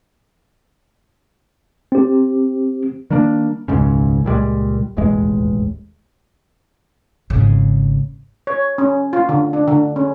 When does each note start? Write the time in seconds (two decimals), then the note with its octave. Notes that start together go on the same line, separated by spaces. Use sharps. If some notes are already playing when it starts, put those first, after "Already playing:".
1.92 C4 G4
3.10 D#3 G3 A#3 D4
3.68 E1 C#2 G#2 C#3
4.25 C#2 A#2 G3 G#3
4.97 E1 A1 D#2 G#3
7.30 G#1 C#3
8.47 C#5
8.78 C#4
9.13 F4
9.29 D3
9.53 D4
9.68 D3
9.96 C#4